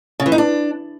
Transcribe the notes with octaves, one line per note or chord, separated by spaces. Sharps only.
C#3
E3
D#4
D4